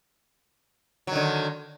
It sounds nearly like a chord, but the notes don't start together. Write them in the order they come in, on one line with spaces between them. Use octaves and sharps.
F#3 D#3 D3